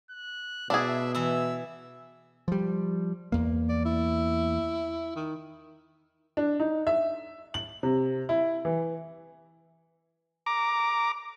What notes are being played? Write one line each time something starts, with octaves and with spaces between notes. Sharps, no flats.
F#6
B2 D4 E4 G#4 E5
E3 E4 E6
F3 G3
E2 A#3
D5
E4
D#3
D4
D#4
E5
F#7
C3
E4
E3
A#5 D6